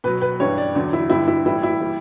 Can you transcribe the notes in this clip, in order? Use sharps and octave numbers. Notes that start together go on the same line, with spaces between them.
B2 F#3 B4
B4
G2 E3 G3 C#5
D5
E2 D3 F#3
E4
G2 D3 G3 E4
E4
A2 E3 G3 E4
E4
E3 G3